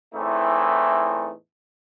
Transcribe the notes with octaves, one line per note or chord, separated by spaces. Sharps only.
E2 A2 E3 A3 C4 D#4